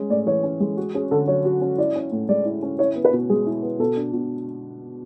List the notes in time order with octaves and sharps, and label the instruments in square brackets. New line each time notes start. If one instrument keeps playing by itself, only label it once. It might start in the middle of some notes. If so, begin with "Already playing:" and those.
Already playing: [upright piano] G#3 C#4
[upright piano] A2 [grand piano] D5
[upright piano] E3 [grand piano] C#5
[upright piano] C#4
G#3
F#4
[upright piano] C#4 [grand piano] G#4
[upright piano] D3 [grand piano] A4
[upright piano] F#3 [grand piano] C#5
[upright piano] F#4
C#4
[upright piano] E4 [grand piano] D5
[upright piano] C#4
A2
[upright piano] G#3 [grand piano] D5
[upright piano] E4
C#4
[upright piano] E4 [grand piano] C#5
[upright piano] B3
[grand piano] B4
[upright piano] B2
[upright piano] G#3 [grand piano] G#4
[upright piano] E4
B3
[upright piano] B2 [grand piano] A4
[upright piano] D4
B2